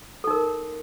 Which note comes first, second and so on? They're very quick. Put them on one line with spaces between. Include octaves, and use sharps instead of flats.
A4 D#4 A#4